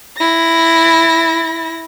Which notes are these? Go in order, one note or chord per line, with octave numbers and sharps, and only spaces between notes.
E4 A#6